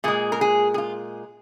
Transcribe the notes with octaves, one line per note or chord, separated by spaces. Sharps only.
A#2 G#3 G#4
A#4
G#4
G#4
F4